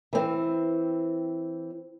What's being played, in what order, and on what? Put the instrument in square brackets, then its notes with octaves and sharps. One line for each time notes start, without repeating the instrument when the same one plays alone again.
[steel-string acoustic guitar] E3 C4